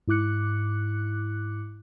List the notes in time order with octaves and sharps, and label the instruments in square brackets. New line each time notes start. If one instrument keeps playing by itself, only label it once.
[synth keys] G#2 E4 D6 F#6 C#7